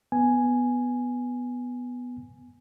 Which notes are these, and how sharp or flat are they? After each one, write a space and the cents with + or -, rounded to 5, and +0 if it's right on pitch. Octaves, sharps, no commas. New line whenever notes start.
B3 +0 G#5 +0